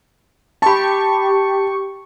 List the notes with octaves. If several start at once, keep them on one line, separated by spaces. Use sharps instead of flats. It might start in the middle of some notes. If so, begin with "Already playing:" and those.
G4 A5 B5 C#6